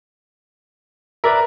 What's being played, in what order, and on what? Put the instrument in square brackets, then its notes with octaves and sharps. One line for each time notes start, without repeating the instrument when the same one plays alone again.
[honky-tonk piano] A#4 [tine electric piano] B4 D5 E5